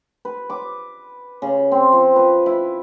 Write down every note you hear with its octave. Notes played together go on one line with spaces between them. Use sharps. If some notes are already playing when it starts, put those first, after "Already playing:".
B4
D6
C#3
C4
F3
B4
E4